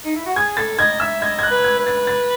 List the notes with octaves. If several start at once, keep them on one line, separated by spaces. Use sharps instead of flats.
D#4
E4
F#4
G#4 G#6
A4 A6
D#5 G#6
E5 E6
D#5 G#6
G#6
F#6
B4
G#6
B4
A6
A6